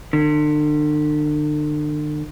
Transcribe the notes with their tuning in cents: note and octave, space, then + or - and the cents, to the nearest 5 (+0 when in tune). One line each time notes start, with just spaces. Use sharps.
D3 +40